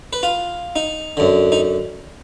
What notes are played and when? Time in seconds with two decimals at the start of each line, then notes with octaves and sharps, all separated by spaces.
0.13 B4
0.23 F4
0.76 D#4
1.17 F#2 D3
1.52 D#4